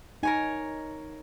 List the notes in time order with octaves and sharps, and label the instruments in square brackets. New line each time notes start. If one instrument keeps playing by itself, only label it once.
[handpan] D#4 [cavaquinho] A#4 C#5 G#5